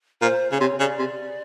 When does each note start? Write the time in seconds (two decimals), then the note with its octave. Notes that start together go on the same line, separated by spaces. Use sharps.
0.22 A#2 C5
0.50 C#3 C#5
0.60 C3
0.79 C#3 D5
0.99 C3